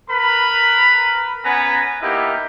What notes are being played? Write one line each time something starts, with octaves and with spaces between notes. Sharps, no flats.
A#4 B4 A#5 B5
B3 C#4 B4 G#5 A#5
A#3 B3 D#4 E4 G4